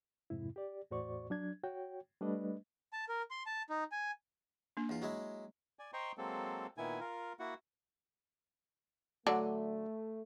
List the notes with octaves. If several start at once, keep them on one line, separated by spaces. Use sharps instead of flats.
F2 G#2 C3 E4
G4 D5
E2 A2 F#4 C5 D5 C#6
F#3 D4 G#6
F#4 C#5 G5
G3 A3 D4 B4 D#5
A5
A#4
C6
A5
D#4
G#5
A#3 D4
E2 F4
F#3 G#3 E4
D5 G#5
C5 D#5 G5 A#5 C6 C#6
F#3 G#3 A#3 C4 A4
A#2 D#3 B3 E4 G#5
F4 A#4
A#3 E4 F#4 F#5
D3 F#3 A3 D4